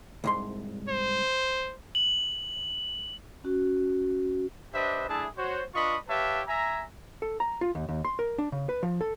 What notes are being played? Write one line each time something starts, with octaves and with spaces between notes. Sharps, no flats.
C2 G#2 C6
C5
F#7
C#4 F#4
D4 G4 B4 C5 D#5 E5
A3 D4 E4 G#4 E5 A5
F#4 C5 C#5
D4 F4 B4 D#5 B5 C#6
G4 B4 C#5 E5 F5 A5
E5 G#5 A#5
A4
A#5
F4
D#2
D#2
C6
A#4
D4
C#3
B4
F3
A4